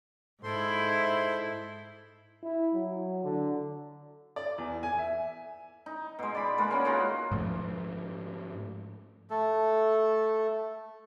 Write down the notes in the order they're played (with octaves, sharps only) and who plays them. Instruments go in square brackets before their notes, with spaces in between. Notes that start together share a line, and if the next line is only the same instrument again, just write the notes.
[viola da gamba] G#2 E4 [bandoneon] A4 C5 C6
[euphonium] E4
F#3
D3
[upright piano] D5
E2
G#5
E5
[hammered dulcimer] D#4
B2 G#3
D5 B5
G#3 A#3 B4
G#3 C#4 F#4
A#3 D#4 F4 F#4
[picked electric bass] G#2 F3 A3
[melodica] A3 A4